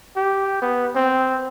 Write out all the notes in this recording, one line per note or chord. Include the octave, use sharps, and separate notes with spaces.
G4
B3
C4